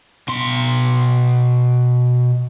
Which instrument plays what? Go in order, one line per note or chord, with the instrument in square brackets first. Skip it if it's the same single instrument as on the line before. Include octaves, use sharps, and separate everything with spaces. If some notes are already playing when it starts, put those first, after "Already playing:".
[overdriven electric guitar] B2 C6